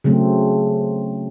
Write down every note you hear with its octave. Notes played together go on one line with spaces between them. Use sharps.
C#3 F#3 A3 C4